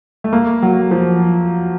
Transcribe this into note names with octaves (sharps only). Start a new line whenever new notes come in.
A3
A#3
F#3
F3